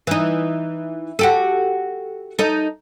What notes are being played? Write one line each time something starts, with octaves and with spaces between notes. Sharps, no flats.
E3 D#4
F#4 G4 A4
D#4 A4